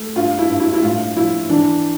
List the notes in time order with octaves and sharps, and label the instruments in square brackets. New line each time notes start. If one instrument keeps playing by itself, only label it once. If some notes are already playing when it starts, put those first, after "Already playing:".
Already playing: [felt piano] A3
G2 F4
E4
G2
E4
E4
A2 F4
F3 E4
E3 D4